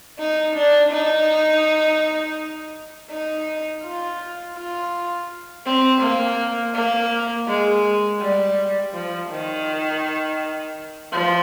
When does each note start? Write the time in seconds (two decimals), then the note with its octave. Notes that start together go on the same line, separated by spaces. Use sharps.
0.19 D#4
0.56 D4
0.92 D#4
3.11 D#4
3.84 F4
4.57 F4
5.66 C4
6.02 A#3
6.74 A#3
7.48 G#3
8.21 G3
8.93 F3
9.30 D#3
11.12 F3